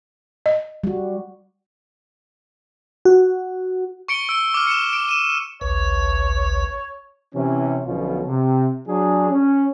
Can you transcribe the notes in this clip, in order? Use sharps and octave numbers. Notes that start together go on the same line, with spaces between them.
D#5
G3 F#4
F#4
C#6 C#7 D7 G7
E6 D7 G7
D6 F6
C#7 E7
D7
D#7 E7
A1 D2 B4 C#5
C3 E3 C#4
B1 B2 D3 F3 C#4 F4
C3
F#3 D4 G#4
C#4